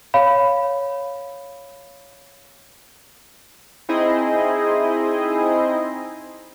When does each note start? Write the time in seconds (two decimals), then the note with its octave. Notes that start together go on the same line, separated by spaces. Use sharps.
0.14 C#5 F5 B5
3.89 C4 D#4 E4 G#4 C5 D#5